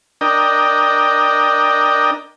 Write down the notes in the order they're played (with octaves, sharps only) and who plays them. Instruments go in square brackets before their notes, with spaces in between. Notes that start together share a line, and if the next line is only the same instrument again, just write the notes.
[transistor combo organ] D4 A#4 D#5 G5